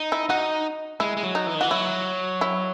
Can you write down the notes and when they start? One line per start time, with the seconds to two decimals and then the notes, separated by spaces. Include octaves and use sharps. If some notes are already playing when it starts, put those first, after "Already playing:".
Already playing: D#4
0.12 E4
0.29 D#4 F#4
1.00 G#3 E4
1.17 G#3
1.23 F#3
1.35 D#4
1.47 E3
1.55 D#3
1.61 E3 F#4
1.70 F#3 E4
2.41 E4